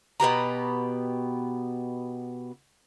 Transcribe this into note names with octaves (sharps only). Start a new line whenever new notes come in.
B2 B3 G4 A#5